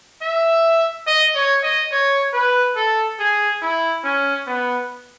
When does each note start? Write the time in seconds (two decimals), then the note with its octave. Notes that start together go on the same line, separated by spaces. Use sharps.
0.22 E5
1.07 D#5
1.35 C#5
1.63 D#5
1.92 C#5
2.33 B4
2.76 A4
3.19 G#4
3.62 E4
4.04 C#4
4.47 B3